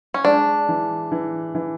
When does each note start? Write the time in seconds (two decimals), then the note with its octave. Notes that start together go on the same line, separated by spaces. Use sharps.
0.14 C#4
0.25 G#3 D4
0.69 E3
1.12 E3
1.55 E3